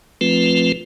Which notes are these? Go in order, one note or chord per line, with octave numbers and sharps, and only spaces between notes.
F3 A3 C4 F4 B4